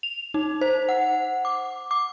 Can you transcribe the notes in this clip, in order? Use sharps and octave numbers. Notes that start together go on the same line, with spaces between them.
F7
D#4
C5
F#5
D6
D6